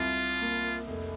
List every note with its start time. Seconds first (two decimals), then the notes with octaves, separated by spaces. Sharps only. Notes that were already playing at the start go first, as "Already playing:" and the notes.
Already playing: C2 C3 F4
0.41 A#3
0.87 F1